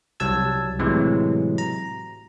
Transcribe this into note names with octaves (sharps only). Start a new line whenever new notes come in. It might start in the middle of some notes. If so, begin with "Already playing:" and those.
C2 F#3 G3 A5 E6 G#6
A2 C3 E3 F#3 G#3
A#5